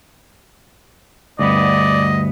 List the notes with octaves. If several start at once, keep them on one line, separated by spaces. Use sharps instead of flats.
D2 G2 B3 D5 D#5